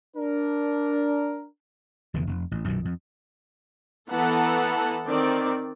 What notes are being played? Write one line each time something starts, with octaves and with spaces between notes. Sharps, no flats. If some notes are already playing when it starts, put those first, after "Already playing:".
D4 A#4
F1 E2 D3 E3
F1
A1
B1 F#2 A#2 D#3
F2
E3 B3 A4 F#5 A5 A#5
D#3 C4 D5